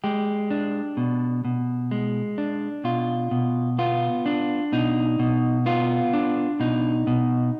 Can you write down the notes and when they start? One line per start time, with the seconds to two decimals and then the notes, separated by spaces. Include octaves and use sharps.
0.04 G#3 G4
0.51 D4
0.97 B2
1.45 B2
1.91 G#3
2.38 D4
2.84 B2 F4
3.31 B2
3.79 B3 F4
4.26 D4
4.72 B2 D#4
5.19 B2
5.66 B3 F4
6.13 D4
6.60 B2 D#4
7.07 B2